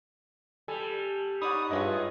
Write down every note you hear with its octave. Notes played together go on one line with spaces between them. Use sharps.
G3 A4 G#5
D#4 C#5 D5 F#5 B5 D#6
G2 E4 F4 G#4 C#5 D#5 F#5